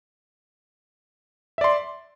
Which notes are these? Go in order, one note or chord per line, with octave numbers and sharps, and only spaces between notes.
D5 E5 C6